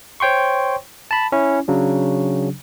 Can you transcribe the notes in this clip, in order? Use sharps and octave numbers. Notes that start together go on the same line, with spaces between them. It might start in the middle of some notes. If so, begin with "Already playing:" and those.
C5 C#5 G5 C6 C#6
A5 B5
C#4 E4
C#3 F#3 D4